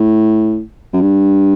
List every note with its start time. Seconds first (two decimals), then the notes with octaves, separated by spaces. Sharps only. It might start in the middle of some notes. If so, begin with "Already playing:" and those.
Already playing: A2
0.93 F#2
1.01 G2